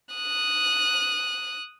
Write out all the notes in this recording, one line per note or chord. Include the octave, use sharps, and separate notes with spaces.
D#6 F#6